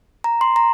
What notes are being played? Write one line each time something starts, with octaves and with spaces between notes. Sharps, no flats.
A#5
C6
A#5